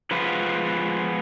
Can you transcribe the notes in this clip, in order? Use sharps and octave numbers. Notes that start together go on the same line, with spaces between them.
F3 G#3 B3 F4 B4